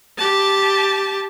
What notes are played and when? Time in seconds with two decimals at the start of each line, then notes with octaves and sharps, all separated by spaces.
0.18 G4 A5